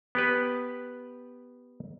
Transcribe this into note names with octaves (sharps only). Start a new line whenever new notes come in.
B3 G4 B4